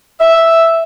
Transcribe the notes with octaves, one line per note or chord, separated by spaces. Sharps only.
E5